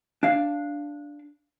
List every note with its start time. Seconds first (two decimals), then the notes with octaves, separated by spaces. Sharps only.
0.23 D4 F5